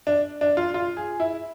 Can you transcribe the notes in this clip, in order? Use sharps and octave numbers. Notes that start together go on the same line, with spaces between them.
D4
D4
F4
F4
G#4
E4